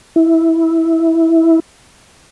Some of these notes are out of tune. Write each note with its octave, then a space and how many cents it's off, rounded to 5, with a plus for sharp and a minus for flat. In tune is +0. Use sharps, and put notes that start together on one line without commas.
E4 -10